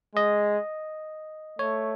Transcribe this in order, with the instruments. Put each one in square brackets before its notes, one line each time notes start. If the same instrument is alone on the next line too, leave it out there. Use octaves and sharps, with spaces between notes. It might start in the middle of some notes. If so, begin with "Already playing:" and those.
[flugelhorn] G#3 [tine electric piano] D#5
[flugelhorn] A3 [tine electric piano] C#5